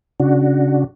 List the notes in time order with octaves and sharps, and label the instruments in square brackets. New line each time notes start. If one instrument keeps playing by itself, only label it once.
[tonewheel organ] C#3 D4 F#4